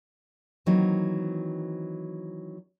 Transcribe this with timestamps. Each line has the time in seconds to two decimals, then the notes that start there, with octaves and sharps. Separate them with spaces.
0.66 D#3 E3 F#3 A#3 C4 D#4